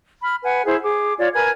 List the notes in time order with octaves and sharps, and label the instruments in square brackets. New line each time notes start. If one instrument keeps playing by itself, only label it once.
[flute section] B5 F6
B4 F#5 G#5
E4 G#4 C5
G#4 D6
F4 C#5 D5
A#4 B4 G#5 G#6